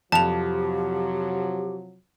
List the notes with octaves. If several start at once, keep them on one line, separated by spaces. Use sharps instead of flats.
F2 C3 F3 F#3 G4 A5 F7